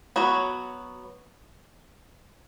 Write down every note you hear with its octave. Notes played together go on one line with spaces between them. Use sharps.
F#3 B3 F#4 C#5